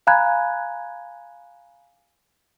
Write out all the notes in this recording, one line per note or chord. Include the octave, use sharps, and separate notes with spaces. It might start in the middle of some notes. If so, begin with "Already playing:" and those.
F5 G#5 A#5 B5 F#6 G#6